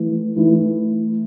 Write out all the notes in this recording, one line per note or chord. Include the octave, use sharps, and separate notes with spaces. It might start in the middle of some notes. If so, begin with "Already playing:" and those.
Already playing: E3 A3 E4
E3 A3 E4